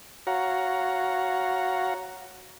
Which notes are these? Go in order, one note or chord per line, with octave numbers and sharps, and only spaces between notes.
F#4 C#5 F5 F#5 A#5